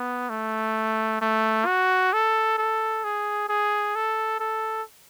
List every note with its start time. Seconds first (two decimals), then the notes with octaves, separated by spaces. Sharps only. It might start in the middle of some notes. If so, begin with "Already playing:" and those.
Already playing: B3
0.29 A3
1.21 A3
1.66 F#4
2.13 A4
2.58 A4
3.04 G#4
3.49 G#4
3.95 A4
4.40 A4